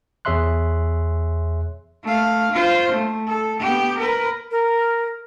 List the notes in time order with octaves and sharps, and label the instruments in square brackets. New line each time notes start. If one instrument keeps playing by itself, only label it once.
[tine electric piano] E2 G#4 C#5 E5 C6 F#6
[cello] A3 F5
F4 C5
A3
A4
B3 G4
A#4 B4
[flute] A#4